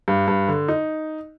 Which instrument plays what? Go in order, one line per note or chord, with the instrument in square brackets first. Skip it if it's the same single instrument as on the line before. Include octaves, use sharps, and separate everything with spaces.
[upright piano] G2
G2
D3
D#4